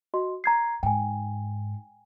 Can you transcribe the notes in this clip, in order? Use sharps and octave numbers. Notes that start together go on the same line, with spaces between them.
F#4 D#5 C6
A#5 G#6 C7
G#2 G5 G#5